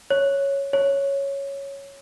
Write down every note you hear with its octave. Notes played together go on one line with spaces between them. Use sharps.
C#5
C#5